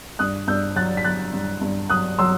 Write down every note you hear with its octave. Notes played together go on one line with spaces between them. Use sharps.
G2 D#6 F#6
G2 E6 G6
F#3 F#6 A6
B6
F#3 F#6 A6
G2
G2
F#3 D#6 F#6
F#3 C6 E6